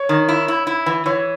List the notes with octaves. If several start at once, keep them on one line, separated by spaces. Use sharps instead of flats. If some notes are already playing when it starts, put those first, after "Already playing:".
Already playing: C#5
D#3
E4
E4
E4
E3
E3 C#5